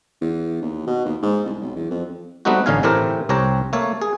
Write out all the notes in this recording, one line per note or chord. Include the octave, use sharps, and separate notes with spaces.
E2
D#2
B2
D#2
G#2
C2
B1
E2
F2
G3 A3 B3 C4 D#4 F#4
A1 D3 C#4 D#4 F5 G#5
A2 E3 A3 C4 G4 A#4
C2 C4 G4 C#5 A#5
A3 A#3 A4 C#5
G#4